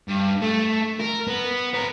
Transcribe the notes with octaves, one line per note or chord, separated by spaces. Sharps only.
G2
A3
A#4
B3
B4 A#5